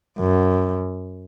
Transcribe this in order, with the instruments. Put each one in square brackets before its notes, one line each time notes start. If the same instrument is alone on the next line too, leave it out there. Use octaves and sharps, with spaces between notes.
[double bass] F#2